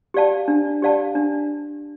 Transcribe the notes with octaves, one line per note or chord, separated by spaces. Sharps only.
G4 D5 F5 A5
D4
G4 D5 F5 A5
D4